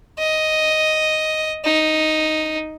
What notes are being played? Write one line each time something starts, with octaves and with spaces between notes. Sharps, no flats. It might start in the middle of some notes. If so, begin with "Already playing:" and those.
D#5
D#4